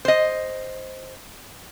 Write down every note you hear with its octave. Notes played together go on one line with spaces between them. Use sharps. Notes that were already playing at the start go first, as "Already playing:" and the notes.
C5 D#5